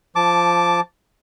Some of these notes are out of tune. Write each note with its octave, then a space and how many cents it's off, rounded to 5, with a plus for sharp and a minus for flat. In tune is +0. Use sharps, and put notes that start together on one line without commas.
F3 -5 A5 +0 D6 +0